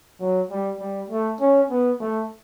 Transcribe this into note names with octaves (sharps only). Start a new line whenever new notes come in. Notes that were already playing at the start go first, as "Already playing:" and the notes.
F#3
G3
G3
A3
C#4
B3
A3